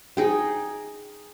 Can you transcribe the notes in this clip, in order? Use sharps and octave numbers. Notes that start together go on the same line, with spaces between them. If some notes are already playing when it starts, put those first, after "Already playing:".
D#4 G#4 G5